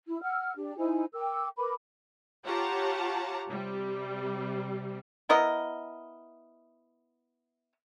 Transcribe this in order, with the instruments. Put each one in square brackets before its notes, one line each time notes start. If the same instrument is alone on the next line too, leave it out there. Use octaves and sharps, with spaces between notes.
[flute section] E4
F#5 E6 F6
D4 G4
D#4 E4 C5 G#5
A#4 G5 D6 E6
A#4 B4 B5 D6
[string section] F4 G4 C#5 F#5 A5 A#5
C3 G3
[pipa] B3 E4 A#4 D#5